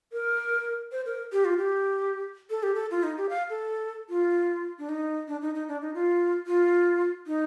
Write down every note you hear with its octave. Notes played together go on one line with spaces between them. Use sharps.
A#4
C5
A#4
G4
F4
G4
A4
G4
A4
F4
D#4
G4
F5
A4
F4
D4
D#4
D4
D#4
D#4
D4
D#4
F4
F4
D#4